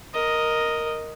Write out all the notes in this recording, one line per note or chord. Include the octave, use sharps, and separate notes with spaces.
A#4 D#5